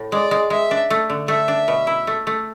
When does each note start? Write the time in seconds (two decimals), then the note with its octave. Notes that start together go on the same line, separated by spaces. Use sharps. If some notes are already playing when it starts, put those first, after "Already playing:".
Already playing: A2
0.12 G#3 D5
0.31 G#3
0.50 G#3 E5
0.71 D4
0.90 A3
1.10 D3
1.28 A3 E5
1.48 D4
1.68 B2
1.87 E4
2.07 A3
2.27 A3